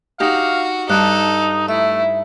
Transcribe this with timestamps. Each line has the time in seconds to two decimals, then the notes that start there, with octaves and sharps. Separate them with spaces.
0.20 D#4 F#4 G4 F5
0.89 G2 D#4 A4 F#6
1.68 A3 E4 E5